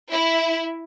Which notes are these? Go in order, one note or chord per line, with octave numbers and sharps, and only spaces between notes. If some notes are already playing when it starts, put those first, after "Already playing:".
E4